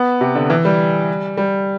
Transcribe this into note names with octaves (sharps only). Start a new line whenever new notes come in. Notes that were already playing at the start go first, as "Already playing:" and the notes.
Already playing: B3
C3
D3
E3
G3
G3